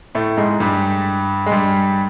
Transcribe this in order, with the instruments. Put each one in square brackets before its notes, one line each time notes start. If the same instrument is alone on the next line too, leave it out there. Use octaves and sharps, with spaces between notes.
[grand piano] A2 A3
G#2 G#3
G2 G3
G#3
G2 G3